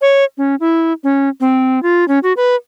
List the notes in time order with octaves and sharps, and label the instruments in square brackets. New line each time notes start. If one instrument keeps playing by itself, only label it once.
[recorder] C#5
C#4
E4
C#4
C4
F4
C#4
F#4
B4